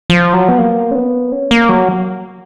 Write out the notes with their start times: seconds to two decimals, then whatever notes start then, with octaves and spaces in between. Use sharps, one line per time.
0.10 F3
0.34 F#3
0.49 B3
0.58 A#3
0.91 C#4
0.95 B3
1.32 C#4
1.51 A#3
1.69 F#3